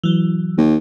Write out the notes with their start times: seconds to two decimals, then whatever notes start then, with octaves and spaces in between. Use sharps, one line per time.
0.04 E3 F#3
0.57 D#2